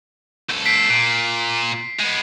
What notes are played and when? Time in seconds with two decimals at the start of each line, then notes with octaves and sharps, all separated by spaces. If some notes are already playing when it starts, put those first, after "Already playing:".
0.49 C#2 A4
0.66 B6 C7 D7
0.90 A#2
1.99 G#3 B3